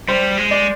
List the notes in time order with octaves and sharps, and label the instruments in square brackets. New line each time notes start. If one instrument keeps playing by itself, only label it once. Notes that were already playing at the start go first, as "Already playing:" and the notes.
[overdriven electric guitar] G3 [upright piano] C5
[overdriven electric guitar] G#3
[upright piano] D5